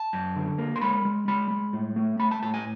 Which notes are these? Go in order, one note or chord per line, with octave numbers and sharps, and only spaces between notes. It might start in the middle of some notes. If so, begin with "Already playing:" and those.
Already playing: A5
F#2
D3
A#3
C6
G#3 B5
G#3
G#3 B5
G#3
A2
A3
A3 B5
A5
A2 A5
G#5